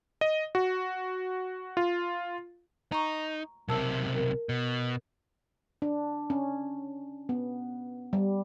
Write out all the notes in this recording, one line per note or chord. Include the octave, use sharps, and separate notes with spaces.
D#5
F#4
F4
D#4 A#5 C#6
B1 C3 A#4 A5 E6
A#4
B2
D4
C#4
B3
G3